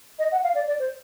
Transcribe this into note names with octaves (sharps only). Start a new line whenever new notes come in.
D#5
F#5
F5
D5
D5
C5